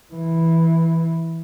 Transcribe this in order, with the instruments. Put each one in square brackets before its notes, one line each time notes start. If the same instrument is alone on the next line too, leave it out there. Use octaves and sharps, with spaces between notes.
[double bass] E3